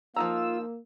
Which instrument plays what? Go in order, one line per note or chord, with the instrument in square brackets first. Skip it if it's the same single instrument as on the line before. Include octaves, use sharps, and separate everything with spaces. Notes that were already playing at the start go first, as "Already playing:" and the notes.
[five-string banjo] F3 D#4 A#5 [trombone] A#3 [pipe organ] F4 [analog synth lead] E6